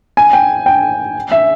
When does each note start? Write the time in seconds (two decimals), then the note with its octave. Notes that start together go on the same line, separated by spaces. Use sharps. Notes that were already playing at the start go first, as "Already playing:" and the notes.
0.17 G#5
0.33 G5
0.66 G5
1.32 E5